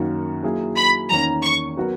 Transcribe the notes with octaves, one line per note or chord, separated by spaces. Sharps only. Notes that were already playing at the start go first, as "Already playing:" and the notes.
Already playing: F#2 D#3 A#3 C#4 F#4
F#3 A#3 E4 G#4
B5
E2 D#3 A#3 C#4 A#5
C#6
F#3 B3 F#4 A#4